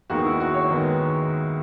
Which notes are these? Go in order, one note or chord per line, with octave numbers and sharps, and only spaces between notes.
D#2 D#3 G#3 B3 F#4
E4
F#4
C#5
D#3 G#3 B3 B4